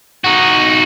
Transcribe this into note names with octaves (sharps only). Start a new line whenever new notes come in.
D#4 F#4